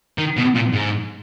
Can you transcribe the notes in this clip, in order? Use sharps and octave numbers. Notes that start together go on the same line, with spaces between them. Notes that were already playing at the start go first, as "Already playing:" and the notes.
D#3
B2
A#2
G#2